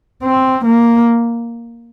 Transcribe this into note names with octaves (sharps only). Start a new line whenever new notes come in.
C4
A#3